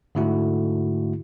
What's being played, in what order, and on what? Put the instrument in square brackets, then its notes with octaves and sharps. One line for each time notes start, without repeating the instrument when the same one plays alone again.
[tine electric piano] G#2 D3 A3 E4 F#4